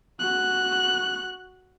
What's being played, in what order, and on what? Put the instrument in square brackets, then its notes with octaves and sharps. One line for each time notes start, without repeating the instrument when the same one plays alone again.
[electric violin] F#4 F#6